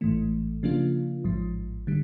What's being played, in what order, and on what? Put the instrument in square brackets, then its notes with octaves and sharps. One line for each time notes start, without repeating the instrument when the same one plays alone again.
[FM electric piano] A1 G#2 E3 A3
C#3 F3 A#3 D4 F4
A1 G#2 F3
D3 G3